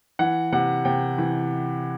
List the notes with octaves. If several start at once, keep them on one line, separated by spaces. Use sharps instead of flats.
E3 F#5
C3 F#5
C3 G5
E3